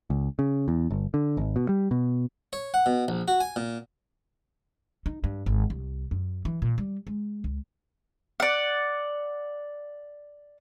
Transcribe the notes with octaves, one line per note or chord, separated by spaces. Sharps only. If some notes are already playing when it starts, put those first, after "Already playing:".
C#2
C#3
E2
G1
D3
G#1
B2
G3
B2
C#5
F#5
B2
A#1
F#4
G#5
A#2
D#4
G2
G#1
C2
F#2
E3
A#2
G3
G#3
C#2
D5 F#5